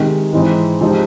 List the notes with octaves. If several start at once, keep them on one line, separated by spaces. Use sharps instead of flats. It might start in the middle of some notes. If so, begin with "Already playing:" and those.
Already playing: C3 D#3 G#3
G#2 E3 G#3 C4 D#4
C3 F3 G#3 C4 D#4